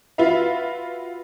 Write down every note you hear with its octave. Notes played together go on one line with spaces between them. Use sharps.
F4 F#4 B4 E5 F5